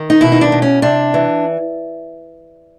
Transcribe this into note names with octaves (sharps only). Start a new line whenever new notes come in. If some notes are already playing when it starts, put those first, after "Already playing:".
Already playing: D#3
D#4
B2 E4
D#4
D4
B2
C#4
C3 D4
E3